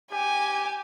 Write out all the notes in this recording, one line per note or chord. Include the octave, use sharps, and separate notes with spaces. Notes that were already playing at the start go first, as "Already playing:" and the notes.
G4 G#5